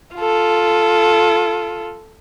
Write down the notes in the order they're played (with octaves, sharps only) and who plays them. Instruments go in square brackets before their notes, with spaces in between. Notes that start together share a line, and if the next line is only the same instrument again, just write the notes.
[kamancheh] F4 A4